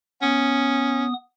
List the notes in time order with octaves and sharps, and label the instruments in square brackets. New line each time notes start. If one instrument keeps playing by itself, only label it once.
[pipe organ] B3 D#6 [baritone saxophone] C#4